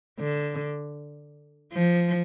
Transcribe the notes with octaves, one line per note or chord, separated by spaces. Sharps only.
D3
F3